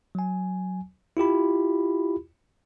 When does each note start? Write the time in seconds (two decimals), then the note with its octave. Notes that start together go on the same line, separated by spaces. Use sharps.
0.15 F#3 G#5
1.17 E4 F4 G4 B5